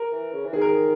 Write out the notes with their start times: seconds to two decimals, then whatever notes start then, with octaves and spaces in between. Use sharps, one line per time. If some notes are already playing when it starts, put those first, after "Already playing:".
Already playing: A#4
0.12 E3
0.33 C#3
0.45 E3
0.53 D#3 G#4
0.61 A#4
0.69 G#4